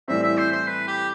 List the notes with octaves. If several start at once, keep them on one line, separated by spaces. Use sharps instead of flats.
A2 E3 G3 C4 E5
E5
C5
C5
B4
G4